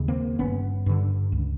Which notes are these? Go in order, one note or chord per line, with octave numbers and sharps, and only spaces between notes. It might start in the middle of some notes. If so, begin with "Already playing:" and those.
Already playing: D#2 C#3
A#3 C4
G1 B3 C#4
G2 D3
C#2